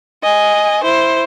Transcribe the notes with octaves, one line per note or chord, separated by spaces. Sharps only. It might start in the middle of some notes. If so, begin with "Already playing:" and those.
D#5 G#5
E4 C5